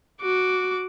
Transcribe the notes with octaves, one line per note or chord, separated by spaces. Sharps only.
F#4 D6